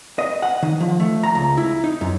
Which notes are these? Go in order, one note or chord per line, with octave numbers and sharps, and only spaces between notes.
D#5
F#5
D#3
F3
A3
A#5
C#2
E4
D#4
F#2